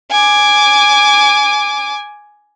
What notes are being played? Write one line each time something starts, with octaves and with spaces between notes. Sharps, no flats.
G#5 D6